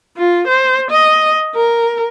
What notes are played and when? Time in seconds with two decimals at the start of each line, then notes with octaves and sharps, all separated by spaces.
0.17 F4
0.47 C5
0.91 D#5
1.56 A#4